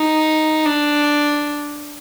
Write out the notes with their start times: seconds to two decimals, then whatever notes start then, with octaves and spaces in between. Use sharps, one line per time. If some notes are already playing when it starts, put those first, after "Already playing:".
Already playing: D#4
0.66 D4